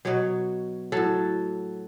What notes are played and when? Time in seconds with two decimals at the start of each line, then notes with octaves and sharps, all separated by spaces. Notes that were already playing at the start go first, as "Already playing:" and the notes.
0.05 B2 F#3 C#5
0.92 A2 F#3 A4